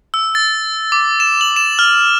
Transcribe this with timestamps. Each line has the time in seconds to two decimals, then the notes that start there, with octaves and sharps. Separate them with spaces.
0.14 E6
0.35 A6
0.92 D6
1.20 E7
1.41 F#7
1.56 E7
1.79 F6